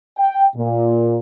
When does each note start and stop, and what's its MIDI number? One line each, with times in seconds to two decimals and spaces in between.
0.18 0.45 79
0.56 1.19 46